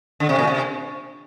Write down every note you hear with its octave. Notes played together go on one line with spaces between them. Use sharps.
D3
C3
A#2
C3